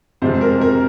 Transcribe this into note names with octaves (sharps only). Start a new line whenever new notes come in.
F2 C3 F3 G#3 C5
A#4
A#4